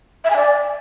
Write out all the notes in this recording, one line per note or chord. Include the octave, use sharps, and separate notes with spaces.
E5
G#5
D5